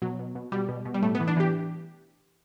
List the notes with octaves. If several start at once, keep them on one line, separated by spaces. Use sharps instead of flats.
B2 F#3
B2
B2
B2 G3
B2
B2
G3
A2 A3
B3
E3
D4
E3 G4